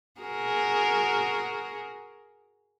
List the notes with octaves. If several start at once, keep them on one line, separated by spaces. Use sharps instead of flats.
F#4 G#4 A#4